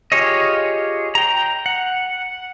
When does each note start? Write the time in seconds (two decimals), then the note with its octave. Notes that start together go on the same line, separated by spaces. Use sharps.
0.12 F4 G4 G#4 C#5 D#5
1.15 G5 A#5
1.66 F#5